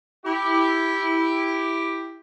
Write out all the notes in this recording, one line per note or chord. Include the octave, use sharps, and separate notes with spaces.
E4 G4